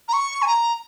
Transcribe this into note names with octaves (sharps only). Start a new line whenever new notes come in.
A#5
C#6
G#5
A#5